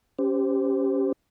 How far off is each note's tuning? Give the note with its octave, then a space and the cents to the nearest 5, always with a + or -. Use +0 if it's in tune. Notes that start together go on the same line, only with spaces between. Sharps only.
C#4 +0 G4 -5 C5 -20